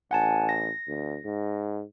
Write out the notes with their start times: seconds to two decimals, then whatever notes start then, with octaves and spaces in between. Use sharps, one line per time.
0.11 A1 F#5 G#5 A5
0.49 A#6
0.88 D2
1.25 G#2